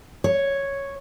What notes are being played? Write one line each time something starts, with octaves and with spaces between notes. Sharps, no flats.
C#5